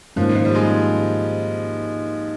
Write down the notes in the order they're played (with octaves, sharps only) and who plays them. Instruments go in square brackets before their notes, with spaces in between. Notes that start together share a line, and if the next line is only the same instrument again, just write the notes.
[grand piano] G#2 D#3 A#3 C#4 [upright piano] F3
[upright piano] F3
G3
G#3